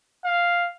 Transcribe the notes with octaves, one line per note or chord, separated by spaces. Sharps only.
F5